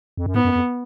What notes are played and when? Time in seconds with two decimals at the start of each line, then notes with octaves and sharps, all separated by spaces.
0.17 F2
0.26 F#2
0.35 G#2 B3
0.45 F#2
0.56 F2